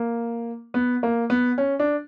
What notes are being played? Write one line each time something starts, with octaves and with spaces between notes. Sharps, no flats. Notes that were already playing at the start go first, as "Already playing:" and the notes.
Already playing: A#3
B3
A#3
B3
C#4
D4